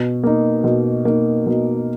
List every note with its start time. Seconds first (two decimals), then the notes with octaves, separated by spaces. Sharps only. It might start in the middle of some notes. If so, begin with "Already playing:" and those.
Already playing: B2
0.23 A#3 D#4
0.64 B2
1.05 A#3 D#4
1.46 B2